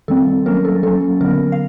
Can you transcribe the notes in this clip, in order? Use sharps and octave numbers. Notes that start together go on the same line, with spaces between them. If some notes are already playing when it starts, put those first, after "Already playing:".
D#3 G3 C4 A4
F#3 A#3 C#4 A#4
A4
F#3 A#3 C#4 A4
D3 F#3 B3 A#4
F5